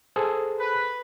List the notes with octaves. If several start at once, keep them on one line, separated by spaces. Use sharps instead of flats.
G#4 A4 C5
B4